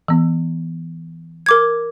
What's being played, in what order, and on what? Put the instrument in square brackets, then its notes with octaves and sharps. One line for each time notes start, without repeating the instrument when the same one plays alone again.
[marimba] E3 B3
[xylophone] A#4 D6 G#6